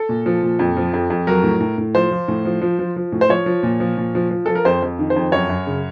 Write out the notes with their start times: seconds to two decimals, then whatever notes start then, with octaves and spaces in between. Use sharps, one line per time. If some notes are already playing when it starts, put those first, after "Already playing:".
Already playing: A4
0.09 A#2
0.26 F3
0.43 A#2
0.59 F2
0.77 F3
0.94 F2
1.10 F2
1.27 F#3 A#4
1.43 A2
1.61 A2
1.78 A2
1.95 F3 C5
2.12 F3
2.28 A2
2.45 F3
2.62 F3
2.79 F3
2.96 F3
3.12 A2
3.21 C5
3.29 F3 C#5
3.46 F3
3.63 A#2
3.80 F3
3.98 A#2
4.15 F3
4.31 F3
4.46 F3 A4
4.55 A#4
4.65 F2 C5
4.82 F2
4.99 D#3
5.10 C5
5.16 F2
5.32 F#2 C#5
5.50 F#2
5.67 C#3